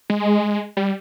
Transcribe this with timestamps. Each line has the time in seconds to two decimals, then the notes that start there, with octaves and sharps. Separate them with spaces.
0.10 G#3
0.77 G3